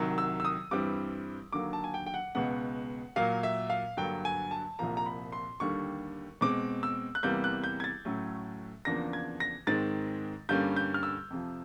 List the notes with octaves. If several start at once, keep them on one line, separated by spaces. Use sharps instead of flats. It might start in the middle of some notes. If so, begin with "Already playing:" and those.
Already playing: C2 C3 D#3 F#3
E6
E6
D#6
G2 E3 G3 C4 D6
D#2 D3 F#3 A#3 D6
A5
G#5
G5
G5
F#5
C#2 B2 G#3 B3 F#5
A#2 F#3 A#3 F5
E5
F5
G2 D3 F#3 A#3 G5
G#5
A5
C2 A#2 F3 A#3 A#5
A#5
B5
C6
D#2 D3 G3 C#6
B2 G#3 C4 D6
E6
F#6
E2 C3 E3 G3 A#3 G6
F#6
G6
G#6
A6
A2 F#3 A3 C#4
E2 C#3 F3 A#3 D4 A#6
G#6
A#6
G#2 D#3 G#3 C4 A6
G2 D3 G3 A#3 C#4 G6
G6
F6
E6
F2 C3 F3